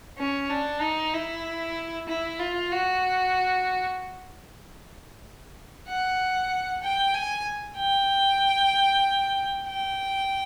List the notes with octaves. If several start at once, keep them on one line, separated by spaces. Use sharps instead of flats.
C#4
D4
D#4
E4
E4
F4
F#4
F#5
G5
G#5
G5
G5